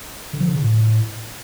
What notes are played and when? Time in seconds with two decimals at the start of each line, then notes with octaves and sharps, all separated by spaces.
0.33 D3
0.40 F3
0.48 D3
0.55 C#3
0.62 A2